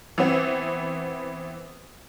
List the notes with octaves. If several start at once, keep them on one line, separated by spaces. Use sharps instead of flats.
E3 B3 C4